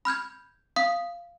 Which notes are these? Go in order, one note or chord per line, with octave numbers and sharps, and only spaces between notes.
B5 F6 G6 G#6
F5 D#6 B6